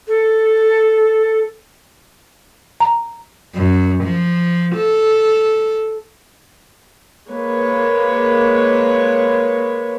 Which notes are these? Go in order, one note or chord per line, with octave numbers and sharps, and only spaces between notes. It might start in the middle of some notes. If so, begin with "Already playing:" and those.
A4
A#5
F#2
F3
A4
G#3 A#3 B4 C#5